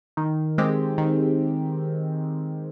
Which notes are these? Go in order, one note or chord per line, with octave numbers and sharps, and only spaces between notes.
D#3
G#3 C4 G4
D#3